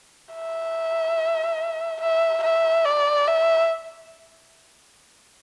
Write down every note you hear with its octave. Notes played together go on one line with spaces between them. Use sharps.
E5
E5
E5
D5
E5